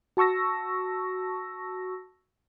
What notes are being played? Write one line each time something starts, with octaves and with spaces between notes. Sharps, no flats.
F#4 A5 C#6 E6 A#6